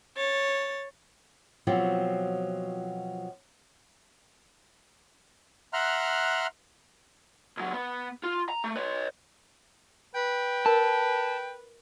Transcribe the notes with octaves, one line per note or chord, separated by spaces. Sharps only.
C#5 A6
B2 F3 F#3 C4 F4 G4
E5 F#5 A#5 C6 F6 F#6
C#2 F#3
B3
F4
A#5
A3
B4 C#5
B4 G5
A#4 A5